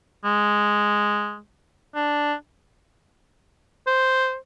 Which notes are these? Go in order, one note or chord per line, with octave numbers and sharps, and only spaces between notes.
G#3
D4
C5